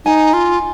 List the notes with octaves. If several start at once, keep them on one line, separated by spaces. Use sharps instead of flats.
D#4 G#5
F4